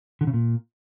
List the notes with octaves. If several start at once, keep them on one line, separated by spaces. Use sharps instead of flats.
D3
C#3
A#2